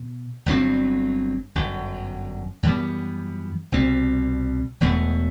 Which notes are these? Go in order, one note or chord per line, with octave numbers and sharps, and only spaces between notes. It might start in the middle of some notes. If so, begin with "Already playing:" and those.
Already playing: B2
G1 G2 F#3 C4
G1 F#2 F#3
F#2 E3 G3 B3
C2 B2 G3 C4
E1 E2 B2 A3